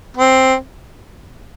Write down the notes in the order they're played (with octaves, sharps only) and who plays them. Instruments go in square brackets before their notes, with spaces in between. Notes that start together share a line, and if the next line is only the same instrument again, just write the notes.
[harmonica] C4